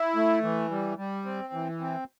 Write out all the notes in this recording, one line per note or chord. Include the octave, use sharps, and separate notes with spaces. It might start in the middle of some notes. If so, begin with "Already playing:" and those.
Already playing: E4
A3
E3
G3
G3
C4
E3
C4